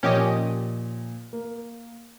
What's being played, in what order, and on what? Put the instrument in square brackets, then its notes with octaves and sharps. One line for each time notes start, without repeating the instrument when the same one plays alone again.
[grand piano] A#2 F3 [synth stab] C#4 G4 D#5
[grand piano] A#3